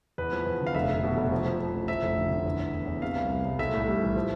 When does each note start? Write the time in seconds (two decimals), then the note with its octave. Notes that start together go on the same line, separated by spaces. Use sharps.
0.18 E2 B4
0.32 F3
0.47 E2
0.61 D3
0.67 F5
0.75 F1 E5
0.89 F1
1.03 B2
1.17 F1
1.32 F3
1.45 F3
1.59 F3
1.74 A1
1.88 F3 E5
2.03 F1
2.17 D3
2.30 D3
2.46 E2
2.60 E2
2.73 E2
2.87 E2
3.02 C3 F5
3.16 C2
3.30 C3
3.45 C2
3.59 B1 E5
3.73 A2
3.87 G3
4.02 E3
4.16 F3